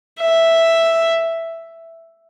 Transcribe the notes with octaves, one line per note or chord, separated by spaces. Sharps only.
E5